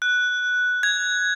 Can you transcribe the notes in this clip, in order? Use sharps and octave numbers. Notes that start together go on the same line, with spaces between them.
F#6
G#6